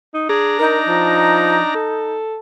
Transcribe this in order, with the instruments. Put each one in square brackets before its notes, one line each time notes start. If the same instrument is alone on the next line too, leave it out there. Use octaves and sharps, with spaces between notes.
[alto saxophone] D#4
[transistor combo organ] D4 A#5 [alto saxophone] G#4
[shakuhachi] D#4 [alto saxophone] A#4
[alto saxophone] F3
A4